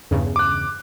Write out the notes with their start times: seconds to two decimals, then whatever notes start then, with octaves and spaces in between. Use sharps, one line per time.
0.11 E2 G2 C#3
0.36 D6 F#6